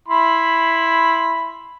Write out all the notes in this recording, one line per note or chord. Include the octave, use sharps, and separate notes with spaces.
E4 B5 C6